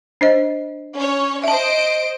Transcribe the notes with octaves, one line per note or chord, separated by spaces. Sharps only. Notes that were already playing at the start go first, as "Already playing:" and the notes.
D4 C5 D#5
C#4 C#5
C5 D#5 E5 A5 D7